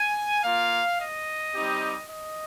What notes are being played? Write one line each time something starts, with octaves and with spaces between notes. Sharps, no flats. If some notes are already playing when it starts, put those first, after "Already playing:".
Already playing: G#5
A#3 F4 F5
D#5
G3 C4 D#4 G4
D#5